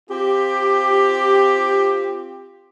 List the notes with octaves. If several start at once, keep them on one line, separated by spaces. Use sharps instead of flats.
C4 F4 G4